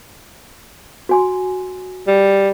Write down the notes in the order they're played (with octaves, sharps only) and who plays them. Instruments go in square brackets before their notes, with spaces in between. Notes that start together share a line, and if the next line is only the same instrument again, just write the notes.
[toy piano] F#4 G#5 C6
[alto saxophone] G3